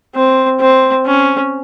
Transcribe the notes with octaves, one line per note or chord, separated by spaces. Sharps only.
C4
C4
C#4